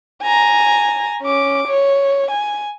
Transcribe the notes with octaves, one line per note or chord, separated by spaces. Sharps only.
G#5 A#5
C#4 D6
C#5
G#5